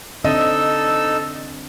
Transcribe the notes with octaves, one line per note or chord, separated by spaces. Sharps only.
D3 C4 D4 D#4 A4 D#5 E6